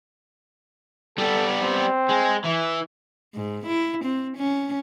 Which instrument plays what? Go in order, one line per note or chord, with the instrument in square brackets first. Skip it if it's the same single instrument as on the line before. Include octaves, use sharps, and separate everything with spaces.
[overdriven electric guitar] G3 B3 [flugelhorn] A4
[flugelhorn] C4
[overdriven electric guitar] G#3
E3
[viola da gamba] G#2
E4
C4
C#4